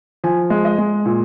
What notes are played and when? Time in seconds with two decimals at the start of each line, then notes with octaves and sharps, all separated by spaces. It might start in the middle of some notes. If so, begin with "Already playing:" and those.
0.24 F3 G#5
0.50 G#3
0.65 D#5
0.78 G#3
1.06 A#2